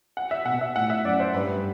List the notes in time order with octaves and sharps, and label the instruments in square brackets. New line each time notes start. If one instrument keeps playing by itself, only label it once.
[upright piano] F#5
E5
[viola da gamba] B2 [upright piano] F#5
[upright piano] E5
[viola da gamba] A2 [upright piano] F#5
[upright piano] E5
[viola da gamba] F#2 [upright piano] D5
[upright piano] C5
[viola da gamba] G2 [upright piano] B4